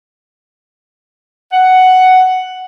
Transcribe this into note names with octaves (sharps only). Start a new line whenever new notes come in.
F#5